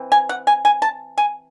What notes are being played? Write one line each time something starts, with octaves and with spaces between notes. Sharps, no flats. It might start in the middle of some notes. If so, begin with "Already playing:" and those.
Already playing: E3 C4
G#5
F#5
G#5
G#5
A5
G#5